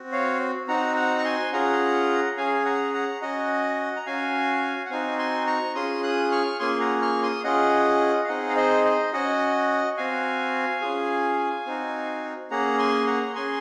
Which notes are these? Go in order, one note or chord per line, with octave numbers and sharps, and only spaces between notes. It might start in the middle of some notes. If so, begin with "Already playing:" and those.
Already playing: C4 F#4
C#5 F5
C4 D#4 F#4 F#5 A#5
F#5 A#5
C#6
G#5 C6
C#4 F4 G#4 F#5 A#5
C#4 G#4 F5 G#5
F#5 A#5
F#5 A#5
C#4 F#4 D#5 F#5
A#5
C#4 F#4 F5 G#5
F#5
C4 D#4 F#4 F5 G#5
G#5 C6
A#5 C#6
C#4 F4 G#4 C6 D#6
D#6 F#6
C#6 F6
A#3 C#4 F4 G#4 G#5 C6
F#5 A#5
C#6 F6
C6 D#6
C#4 F4 G#4 D#5 F#5
F5
C4 D#4 G#4 D#5 F#5
F5
C5 D#5
C5 D#5
C#4 F#4 D#5 F#5
C4 F#4 F5 G#5
C#4 F4 G#4
C4 D#4 F#4
A#3 C#4 G#4 F#5 A#5
G#5 C6
F#5 A#5
C#4 G#4 G#5 C6